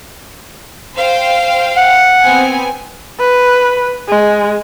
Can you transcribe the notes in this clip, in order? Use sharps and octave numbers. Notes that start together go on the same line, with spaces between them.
C5 F5 G5
F#5
B3 C4 G#5
B4
G#3